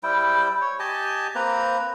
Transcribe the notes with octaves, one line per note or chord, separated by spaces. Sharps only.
G3 E4 C5 G5
C#5
G4 D#5 G#5 A5
A#3 C4 B4 A#5